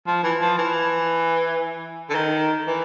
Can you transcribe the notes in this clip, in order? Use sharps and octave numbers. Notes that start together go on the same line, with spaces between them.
F3
E3
F3
E3
D3
D#3
E3